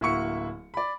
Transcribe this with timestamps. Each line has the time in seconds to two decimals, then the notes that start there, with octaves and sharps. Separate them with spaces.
0.01 D1 A#3 E4 F#4 C#6 C#7
0.74 D5 B5